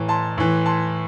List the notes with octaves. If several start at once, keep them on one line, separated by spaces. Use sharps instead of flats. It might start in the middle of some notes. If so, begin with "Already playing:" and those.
Already playing: A2 E3 A#5
A5 C6
A2 E3
A5 C6